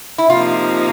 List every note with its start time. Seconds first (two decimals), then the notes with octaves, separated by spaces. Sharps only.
0.18 E4
0.30 C3 F3 A#3 D#4 F4